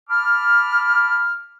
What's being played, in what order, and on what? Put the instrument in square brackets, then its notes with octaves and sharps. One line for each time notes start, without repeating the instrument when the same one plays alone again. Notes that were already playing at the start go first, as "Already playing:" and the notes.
[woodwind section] A5 B5 D6 F6